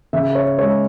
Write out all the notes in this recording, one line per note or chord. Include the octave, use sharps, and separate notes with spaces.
C#3 E5
C#5
G#3 C#5